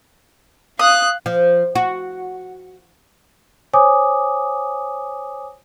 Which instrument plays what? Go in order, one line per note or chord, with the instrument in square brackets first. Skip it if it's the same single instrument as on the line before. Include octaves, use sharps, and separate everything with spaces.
[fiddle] F5 F#6 [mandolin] D#6
[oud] F3
F#4
[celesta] C5 C#5 G#5 D6 D#6